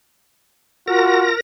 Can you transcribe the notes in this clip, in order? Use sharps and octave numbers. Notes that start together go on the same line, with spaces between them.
F4 F#4 A#4 A#6